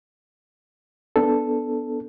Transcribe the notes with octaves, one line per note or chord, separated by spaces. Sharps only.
B3 D4 A4